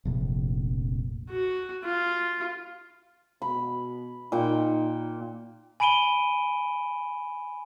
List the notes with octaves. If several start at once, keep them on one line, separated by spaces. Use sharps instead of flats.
F1 A#1
F#4
F4
B2 B5
A#2 D#4 G5
G#5 B5 D7 D#7 G7